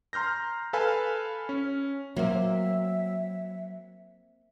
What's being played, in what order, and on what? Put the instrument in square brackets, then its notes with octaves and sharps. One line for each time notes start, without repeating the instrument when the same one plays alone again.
[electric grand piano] A#5 C6 F6 G6 A#6
A4 B4 F5 G#5 B5 F6
C#4
[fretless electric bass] F#3 [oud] A#3 C4 [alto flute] E5